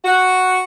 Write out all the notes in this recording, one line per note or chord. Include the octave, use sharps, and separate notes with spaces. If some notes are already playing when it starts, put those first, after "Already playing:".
F#4